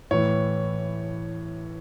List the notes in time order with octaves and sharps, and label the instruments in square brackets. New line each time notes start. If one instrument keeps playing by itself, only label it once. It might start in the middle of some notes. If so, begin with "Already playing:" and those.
[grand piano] A2 E3 C#5